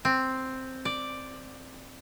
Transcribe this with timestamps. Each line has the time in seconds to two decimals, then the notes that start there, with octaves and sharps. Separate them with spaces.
0.05 C4
0.85 D5